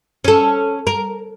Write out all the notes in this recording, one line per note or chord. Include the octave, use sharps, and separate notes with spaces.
C#4 A4
A#4